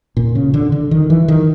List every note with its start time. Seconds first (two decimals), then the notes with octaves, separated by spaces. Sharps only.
0.17 A#2
0.35 C#3
0.54 D3
0.72 D3
0.91 D#3
1.10 E3
1.28 D#3